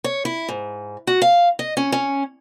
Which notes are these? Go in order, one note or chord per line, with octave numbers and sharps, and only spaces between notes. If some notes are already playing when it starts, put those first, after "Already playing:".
C#5
E4
G#2
F#4
F5
D#5
C#4
C#4